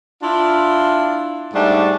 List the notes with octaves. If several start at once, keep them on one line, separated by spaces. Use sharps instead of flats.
D4 E4 F4
G#2 G3 A3 D4